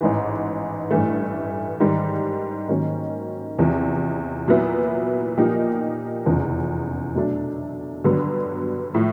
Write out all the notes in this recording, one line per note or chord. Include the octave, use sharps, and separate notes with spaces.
A1 G#2 E3
A1 G2 E3 A3
G#2 D#3 G3
G#2 D#3 F#3 A#3 C#4
E2 C3 F3
A#2 F#3 B3 E4
A#2 F3 A#3 D#4 G4
F1 E2 C#3 F3
B2 F#3 A3 D4
G2 D3 F#3 B3
A2 F3